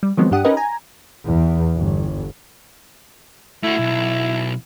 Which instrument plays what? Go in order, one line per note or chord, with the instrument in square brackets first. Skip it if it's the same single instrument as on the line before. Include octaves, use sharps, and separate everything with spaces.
[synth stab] G3
D#3 F3 F#3 G#3 B3 C4
G2 D4 G4 F#5 D#6
C#4 D#4 G4 A#4 B4 D#5
G#5 A#5
[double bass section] E2
G1
[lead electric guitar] A3 F#4 [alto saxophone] E4
[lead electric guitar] B1